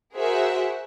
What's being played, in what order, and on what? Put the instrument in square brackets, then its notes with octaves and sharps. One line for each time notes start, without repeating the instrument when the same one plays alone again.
[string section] F#4 G#4 A#4 C5 E5 F#5